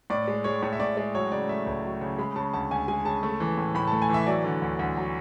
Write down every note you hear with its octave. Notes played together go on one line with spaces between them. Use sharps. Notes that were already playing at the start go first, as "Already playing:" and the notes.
A2 D5
G#3
G#3 C#5
A2 C#5
E5
A2 D5
G#3 D5
F#3 C#5
C#3 D5
A3 E5
C#2
F#3
C#3
G#3 B5
C#3 A5
D2 A5
D2 G#5
G#3 G#5
C#3 A5
A3
E3
A2
A2 B5
A5
A3
G#5
E3 E5
F#3 D5
D3
D2
D2
F#3